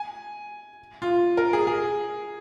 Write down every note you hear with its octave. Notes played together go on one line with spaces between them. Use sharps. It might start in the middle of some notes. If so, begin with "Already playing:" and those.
Already playing: G#5
F4
A#4
G#4
G#4